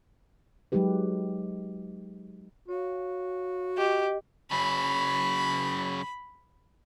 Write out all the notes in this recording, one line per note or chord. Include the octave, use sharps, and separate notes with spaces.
F#3 G#3 D#4 G4 B4
F#4 C#5 F5
G4 D#5
C#3 F#3 B5